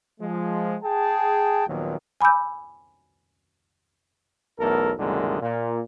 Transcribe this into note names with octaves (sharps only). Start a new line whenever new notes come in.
F3 G#3
G#4 G5 A5
D#2 A#2 D#3 F3 F#3 B3
G#5 B5 D6 E6 G6
B1 E2 A3 A4 A#4
C2 F#2 A#2 D3 D#3 G#3
A#2